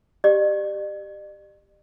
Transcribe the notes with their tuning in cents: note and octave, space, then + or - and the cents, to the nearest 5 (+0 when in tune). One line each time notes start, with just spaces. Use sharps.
G4 +0 D5 +45